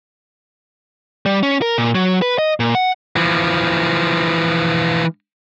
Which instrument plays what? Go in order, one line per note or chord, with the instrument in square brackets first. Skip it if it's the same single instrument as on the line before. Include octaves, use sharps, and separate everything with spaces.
[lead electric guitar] G3
C#4
A#4
A#2
F#3
B4
D#5
A#2
F#5
[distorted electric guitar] E3 F3